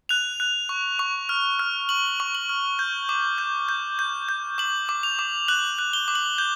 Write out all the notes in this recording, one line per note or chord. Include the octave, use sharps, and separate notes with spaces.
F#6 F7
F#6
C#6
C#6
F6
F6
C#6 F#7
C#6
F#7
F6
G6
D6
G6
G6
G6
G6
D6 F#7
D6
F7
D6
F#6 F#7
F#6
G7
D6
F#7
G6